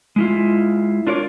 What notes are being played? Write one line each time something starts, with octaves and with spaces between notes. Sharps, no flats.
G#3 E4 F4
D4 F4 A#4 C#5 D5